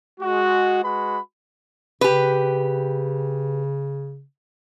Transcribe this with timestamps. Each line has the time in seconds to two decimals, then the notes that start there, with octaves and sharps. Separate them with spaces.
0.20 G#3 F#4
0.83 G#3 F#4 B4 B5
2.01 C#3 G4 B4